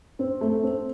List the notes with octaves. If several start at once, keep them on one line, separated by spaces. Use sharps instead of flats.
C4
A3
C4